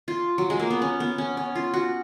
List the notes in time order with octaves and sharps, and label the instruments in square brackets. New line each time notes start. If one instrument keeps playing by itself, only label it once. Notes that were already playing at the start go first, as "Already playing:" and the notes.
[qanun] F4
F#3
G#3
A#3
B3
C#4
B3
C#4
C#4
F4
F#4